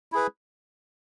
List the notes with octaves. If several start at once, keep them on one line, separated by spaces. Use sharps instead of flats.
E4 G#4 B4